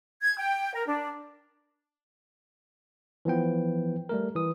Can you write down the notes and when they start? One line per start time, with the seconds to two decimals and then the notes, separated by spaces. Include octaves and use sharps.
0.22 G#6
0.37 G5
0.75 A#4
0.87 D4
3.25 E3 F3 B3 G5
4.09 G3 A3 A#4
4.35 E3 D#6